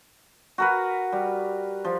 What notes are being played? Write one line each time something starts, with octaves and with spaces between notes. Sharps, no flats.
F#4 A#4 B4
G3
F3